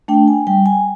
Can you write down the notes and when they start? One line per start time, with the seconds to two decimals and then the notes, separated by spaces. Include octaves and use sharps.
0.08 A3 D4 G5
0.28 G#5
0.47 G3 G5
0.66 G#5